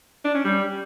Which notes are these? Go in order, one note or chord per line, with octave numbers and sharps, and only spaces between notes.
D4
C#4
G3